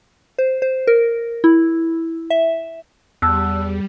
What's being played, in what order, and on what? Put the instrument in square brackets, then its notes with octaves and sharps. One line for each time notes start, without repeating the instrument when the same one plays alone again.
[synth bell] C5
C5
A#4
E4
E5
[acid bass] E2 [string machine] G3 [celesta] A5 E6 F#6